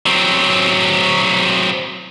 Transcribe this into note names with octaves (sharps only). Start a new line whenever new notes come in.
F#3 C4